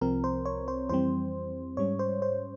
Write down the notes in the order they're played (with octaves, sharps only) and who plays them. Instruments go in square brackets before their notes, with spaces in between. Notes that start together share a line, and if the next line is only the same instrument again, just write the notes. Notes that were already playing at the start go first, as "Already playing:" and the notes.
[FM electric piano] C2 C3 F3 C4 A#4
C5
C#5
C5
F2 E3 G3 C4 C5
G#2 G3 C#4 C#5
C5
C5